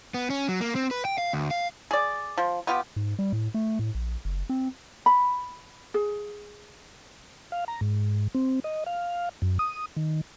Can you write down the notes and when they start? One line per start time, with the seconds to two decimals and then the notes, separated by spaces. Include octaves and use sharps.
0.14 B3
0.30 C#4
0.49 F#3
0.61 A#3
0.75 C4
0.91 B4
1.05 G5
1.18 F5
1.33 D2
1.51 F5
1.91 G#4 D5
2.38 F3
2.67 B3 F4 G4
2.96 G#2
3.19 G3
3.33 A2
3.54 A3
3.79 A2
3.95 A#1
4.25 F#1
4.49 C4
5.06 B5
5.94 G#4
7.52 F5
7.68 A#5
7.81 G#2
8.34 C4
8.64 D#5
8.86 F5
9.42 F#2
9.59 D#6
9.97 D#3